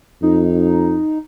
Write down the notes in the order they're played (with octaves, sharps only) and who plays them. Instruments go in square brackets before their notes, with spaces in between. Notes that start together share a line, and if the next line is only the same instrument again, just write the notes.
[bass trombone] F2 [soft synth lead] D#4